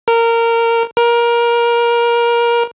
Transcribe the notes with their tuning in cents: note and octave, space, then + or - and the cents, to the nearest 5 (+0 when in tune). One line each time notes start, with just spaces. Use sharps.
A#4 -15
A#4 +20